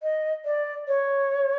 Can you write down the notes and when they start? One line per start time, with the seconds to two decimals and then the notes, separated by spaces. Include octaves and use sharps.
0.02 D#5
0.45 D5
0.87 C#5